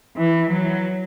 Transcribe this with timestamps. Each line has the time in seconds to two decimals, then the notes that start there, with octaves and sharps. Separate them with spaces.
0.17 E3
0.50 F#3